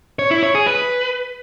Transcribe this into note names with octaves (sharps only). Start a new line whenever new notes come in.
C#5
E4
C#5
G#4
B4